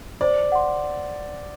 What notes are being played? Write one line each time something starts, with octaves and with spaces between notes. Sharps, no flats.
C5 D5
F#5 C6